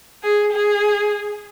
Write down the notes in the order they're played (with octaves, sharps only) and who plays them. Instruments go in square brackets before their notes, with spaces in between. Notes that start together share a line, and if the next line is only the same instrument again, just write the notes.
[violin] G#4
G#4